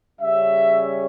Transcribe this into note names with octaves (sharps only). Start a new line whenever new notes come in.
C#3 G3 C#4 E5